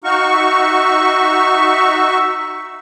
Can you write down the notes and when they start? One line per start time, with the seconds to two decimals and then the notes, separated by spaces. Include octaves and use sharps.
0.04 D#4 F#4 F5 C#6
0.34 E5